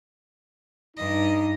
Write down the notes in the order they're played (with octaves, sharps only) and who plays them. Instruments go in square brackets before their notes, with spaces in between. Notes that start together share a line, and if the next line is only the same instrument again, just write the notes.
[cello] G2 D#5 [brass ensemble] D#4